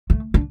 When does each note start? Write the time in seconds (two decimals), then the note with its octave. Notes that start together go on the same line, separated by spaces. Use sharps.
0.10 A3
0.34 D4